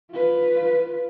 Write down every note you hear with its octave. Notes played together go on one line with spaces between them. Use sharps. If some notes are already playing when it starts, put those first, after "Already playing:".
F4 B4